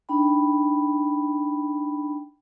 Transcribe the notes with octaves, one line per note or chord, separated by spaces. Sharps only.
D4 D#4 G5 B5